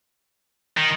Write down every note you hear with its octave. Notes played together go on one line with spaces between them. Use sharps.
D#3